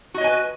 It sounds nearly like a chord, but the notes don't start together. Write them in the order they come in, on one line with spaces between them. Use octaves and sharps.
F#4 D#5 C#5 G#5 B4